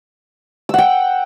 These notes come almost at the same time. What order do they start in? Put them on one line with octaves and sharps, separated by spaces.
E6 F#5 G5